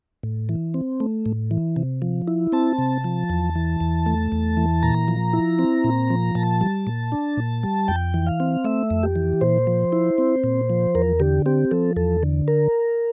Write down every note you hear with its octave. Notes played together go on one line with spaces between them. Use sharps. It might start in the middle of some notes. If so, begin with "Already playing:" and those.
A2
E3
C4
A3
A2
E3
C3
F3
E4
C4 A5
C3
F3
E2
E3
E2
A3
E2
E3
A#2 A#5
F3
E4
C4
A#2
F3
A#2 A5
G3
A#2
D4
A#2
G3
F2 G5
E3
F5
C4
A3 E5
F2
G4
E3
A#2 C5
F3
E4
C4
A#2
F3
E2 A#4
D3 G4
C4 G4
F3 A4
E2 A4
D3
A#4